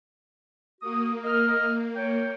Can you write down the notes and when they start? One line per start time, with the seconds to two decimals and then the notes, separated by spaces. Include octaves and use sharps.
0.81 A#3 F#4 D#6
1.24 A#4 D#5 F6
1.96 C#5 G5